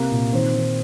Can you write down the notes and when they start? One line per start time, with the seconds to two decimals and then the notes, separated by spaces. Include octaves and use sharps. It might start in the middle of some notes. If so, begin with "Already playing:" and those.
Already playing: C2 A#3
0.11 A#2
0.33 D#3 C4
0.54 D#3